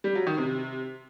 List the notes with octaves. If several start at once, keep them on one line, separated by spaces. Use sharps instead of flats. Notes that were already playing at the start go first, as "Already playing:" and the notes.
G3
F#3
D#3
C3